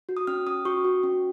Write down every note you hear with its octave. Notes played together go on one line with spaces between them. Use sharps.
F#4
D#6
C#4 F6
C#4 D#6
F#4 C#6
F#4
C#4